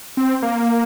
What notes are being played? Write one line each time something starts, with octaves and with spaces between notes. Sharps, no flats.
C4
A#3